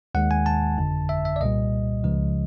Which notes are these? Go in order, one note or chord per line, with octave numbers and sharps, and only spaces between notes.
D#2 D#3 G#3 F#5
G#5
A5
G1 F2 D3
E5
E5
D5
C2 A#2 G3 D#5
C#2 C#3 F3 G#3